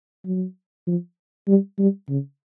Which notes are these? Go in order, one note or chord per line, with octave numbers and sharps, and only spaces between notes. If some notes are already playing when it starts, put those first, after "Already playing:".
F#3
F3
G3
G3
C#3